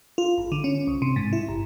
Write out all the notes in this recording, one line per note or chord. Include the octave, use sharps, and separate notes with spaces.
F4
G#1
D3
C#4
C2
C3
G#2
E4
G1